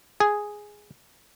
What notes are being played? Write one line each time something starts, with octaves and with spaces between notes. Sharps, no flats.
G#4